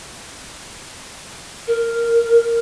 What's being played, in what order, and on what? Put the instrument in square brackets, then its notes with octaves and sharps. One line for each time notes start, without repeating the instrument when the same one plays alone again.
[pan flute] A#4